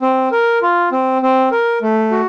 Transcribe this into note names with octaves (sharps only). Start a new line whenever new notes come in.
C4
A#4
F4
C4
C4
A#4
A3
F#4